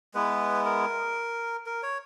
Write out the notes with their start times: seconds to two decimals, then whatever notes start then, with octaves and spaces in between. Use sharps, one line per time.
0.14 G#3 B3 E4 B4
0.65 A#4
1.66 A#4
1.83 C#5